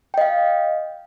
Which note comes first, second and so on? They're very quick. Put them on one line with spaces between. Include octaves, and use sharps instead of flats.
G5 D#5 F5